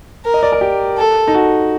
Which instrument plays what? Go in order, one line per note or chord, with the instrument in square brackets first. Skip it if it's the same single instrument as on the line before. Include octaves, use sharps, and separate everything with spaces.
[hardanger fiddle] A#4
[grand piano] D#5
D5
A#4
G4
[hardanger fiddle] A4
[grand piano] D#4
F#4